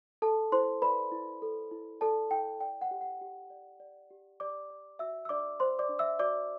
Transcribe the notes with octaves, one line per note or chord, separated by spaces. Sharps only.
A4 A5
E4 C5 C6
B4 D5 B5
E4
A4
E4
A4 D5 A5
E4 G5
D5 G5
F#5
G4
F#5
G4
D5
D5
G4
G4 D5 D6
D5
F#4 E5 E6
E6
D4 D5 D6
C5 C6
D5 D6
D4
E5 E6
F#4 D5 D6